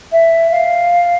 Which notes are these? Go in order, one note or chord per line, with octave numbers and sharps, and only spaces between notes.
E5
F5